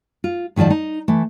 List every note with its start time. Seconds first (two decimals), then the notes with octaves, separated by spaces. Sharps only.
0.24 F4
0.56 G#2 D#3 F3 D5 A5
0.70 D#4
1.08 E3 A3